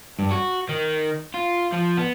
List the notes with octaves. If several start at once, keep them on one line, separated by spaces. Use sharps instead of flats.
G2
F#4
D#3
F4
F3
B3